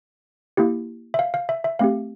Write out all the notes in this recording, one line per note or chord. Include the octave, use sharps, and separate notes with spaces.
A#3 E4 G4
E5
F5
F5
E5
E5
A3 C4 G4 F5